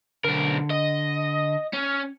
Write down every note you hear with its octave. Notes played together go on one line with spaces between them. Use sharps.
B1 D3 A#4
D#5
C#4